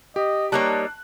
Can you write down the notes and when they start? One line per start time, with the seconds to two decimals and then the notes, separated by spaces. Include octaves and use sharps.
0.16 G4 D#5
0.52 G3 A#3 D#4 C#5 A5 F#6